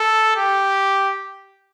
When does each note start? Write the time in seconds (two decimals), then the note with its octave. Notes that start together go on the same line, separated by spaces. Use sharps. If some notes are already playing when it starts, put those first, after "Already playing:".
Already playing: A4
0.36 G4